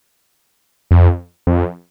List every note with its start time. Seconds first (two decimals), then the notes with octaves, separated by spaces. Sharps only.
0.91 F2
1.47 F2